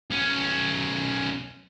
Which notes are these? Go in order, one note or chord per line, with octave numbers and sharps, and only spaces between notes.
B1 C#4